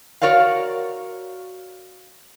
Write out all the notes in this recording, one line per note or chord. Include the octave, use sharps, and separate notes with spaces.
F#4 A#4 C#5 D5 F5